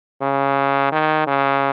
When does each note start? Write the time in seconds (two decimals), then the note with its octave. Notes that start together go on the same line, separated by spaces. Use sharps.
0.21 C#3
0.92 D#3
1.27 C#3